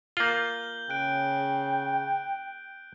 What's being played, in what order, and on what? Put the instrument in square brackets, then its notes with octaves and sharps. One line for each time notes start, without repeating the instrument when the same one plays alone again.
[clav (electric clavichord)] A#3 F4 [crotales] G6 F#7 G7
[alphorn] C#3 [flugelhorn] G5 [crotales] F#6 D7